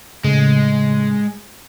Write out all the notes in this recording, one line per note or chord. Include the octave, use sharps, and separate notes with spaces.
A2 C#3 G#3